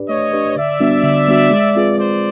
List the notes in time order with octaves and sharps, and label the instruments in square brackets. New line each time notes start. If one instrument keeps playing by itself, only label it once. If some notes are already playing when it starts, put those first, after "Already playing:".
Already playing: [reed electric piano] D4 G4 B4 D5
[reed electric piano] A3 [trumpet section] C#5 D#5
[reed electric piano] D4 G4 B4 D5
[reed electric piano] D3 [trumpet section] D5 E5
[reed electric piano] G3 B3 D4 F#4
D3
G3 B3 D4 F#4
G#3
C4 F4 G#4 B4
[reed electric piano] G#3 [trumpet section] C5 D5